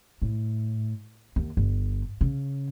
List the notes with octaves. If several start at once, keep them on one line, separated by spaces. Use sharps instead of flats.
A2
D#2
G1
C#3